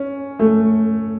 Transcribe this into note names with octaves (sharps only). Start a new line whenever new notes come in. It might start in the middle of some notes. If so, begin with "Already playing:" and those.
Already playing: C#4
A3